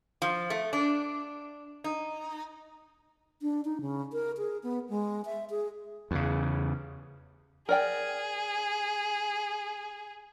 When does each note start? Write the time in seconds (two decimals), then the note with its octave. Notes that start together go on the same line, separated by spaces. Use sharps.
0.22 F3
0.50 A3
0.73 D4
1.84 D#4
3.42 D4
3.65 D#4
3.81 C#3
4.13 A#4
4.38 G#4
4.63 B3
4.90 G#3
5.25 E5
5.50 G#4
6.11 E2 C#3
7.69 G#4 A#4 D5 G5